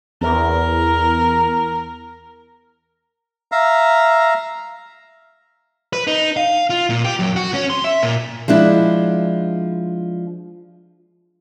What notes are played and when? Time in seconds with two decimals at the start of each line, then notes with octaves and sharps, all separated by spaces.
0.21 E2 A#4
3.52 E5 F5 A#5
5.93 B4
6.07 D#4
6.37 F5
6.70 F4
6.90 A#2
7.05 G4
7.19 F#2
7.36 F#4
7.54 C#4
7.70 C6
7.84 E5
8.03 A#2
8.48 F3 G#3 D4 E4